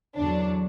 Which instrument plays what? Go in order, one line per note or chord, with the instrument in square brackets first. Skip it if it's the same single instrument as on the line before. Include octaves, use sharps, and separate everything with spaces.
[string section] E2 D3 F#3 D4